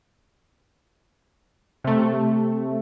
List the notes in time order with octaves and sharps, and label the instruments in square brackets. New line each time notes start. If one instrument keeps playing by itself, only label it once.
[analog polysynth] C3 A3